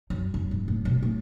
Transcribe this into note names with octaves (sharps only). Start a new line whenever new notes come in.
F#2
F#2
G#2
A2
B2
A2